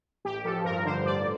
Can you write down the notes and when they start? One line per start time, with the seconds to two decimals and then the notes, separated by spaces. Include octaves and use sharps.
0.24 A1 G4
0.45 F3 A4
0.64 G2 A#4
0.85 D3 C5
1.05 A1 D5